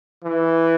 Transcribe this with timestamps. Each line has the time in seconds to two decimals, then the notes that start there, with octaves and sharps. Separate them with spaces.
0.24 E3